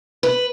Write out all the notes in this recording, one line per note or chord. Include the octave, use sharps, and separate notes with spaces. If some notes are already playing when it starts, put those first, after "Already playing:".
B4